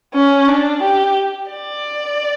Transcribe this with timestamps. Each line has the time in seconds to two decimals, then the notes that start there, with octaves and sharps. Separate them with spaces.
0.14 C#4
0.48 D4
0.83 G4
1.51 D5